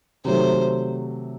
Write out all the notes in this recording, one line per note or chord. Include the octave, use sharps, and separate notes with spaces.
C3 D#3 F#3 A3 C5